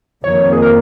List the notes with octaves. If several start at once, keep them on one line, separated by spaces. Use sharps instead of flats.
F2 D#3 A#3 C#5
G#4
A#4